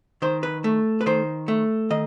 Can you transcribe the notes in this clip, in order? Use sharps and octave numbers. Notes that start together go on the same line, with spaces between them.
D#3 C5
B4
A3
B4
D#3 C5
A3
D#3 D#5